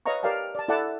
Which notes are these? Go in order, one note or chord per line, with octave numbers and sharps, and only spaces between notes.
B4 C#5 D#5 F5 A#5 C#6
G4 A#4 D5 F5 G5 A5
D5 A5
E4 A4 D5 F#5 A5